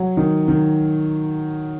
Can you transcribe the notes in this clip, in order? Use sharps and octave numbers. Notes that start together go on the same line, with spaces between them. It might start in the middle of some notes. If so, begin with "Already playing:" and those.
Already playing: F#3
D#3
D#3